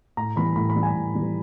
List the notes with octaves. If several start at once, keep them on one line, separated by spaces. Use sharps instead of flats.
A2 A#5
E3 G3 B5
A2 B5
B5
E3 G3
G#5
A2
E3 G3